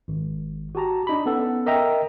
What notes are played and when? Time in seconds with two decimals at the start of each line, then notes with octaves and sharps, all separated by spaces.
0.08 G#1
0.75 F#4 G4 A5 A#5
1.07 D4 D#4 B5
1.26 B3 C#4 A4 F#5
1.66 A#4 D#5 E5 G5 A#5